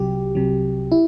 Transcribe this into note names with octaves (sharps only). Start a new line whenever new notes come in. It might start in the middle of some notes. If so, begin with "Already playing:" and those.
Already playing: C2 C3 F#3 G4
C2 C3 F#3
E4